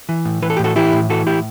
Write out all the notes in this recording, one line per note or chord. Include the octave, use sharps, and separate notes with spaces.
E3
A2
E3 B4
A4
A2 G4
F#4 A4
E3 E4 G4
A2
E3 F#4 A4
A2 E4 G4